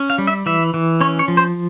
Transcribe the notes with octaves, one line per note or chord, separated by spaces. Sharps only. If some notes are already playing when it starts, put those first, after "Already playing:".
Already playing: C#4
F5
G3
E5
E3 E5
E3
C#4 C#5
C#5
F3
C5